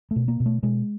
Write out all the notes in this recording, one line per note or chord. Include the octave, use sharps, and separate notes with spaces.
A3
B2
A#3
B2
A3
B2 G#3